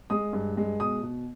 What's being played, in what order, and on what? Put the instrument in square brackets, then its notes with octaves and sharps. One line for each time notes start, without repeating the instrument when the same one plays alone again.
[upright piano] G#3 D#6
G2
G#3
B2 D#6
B2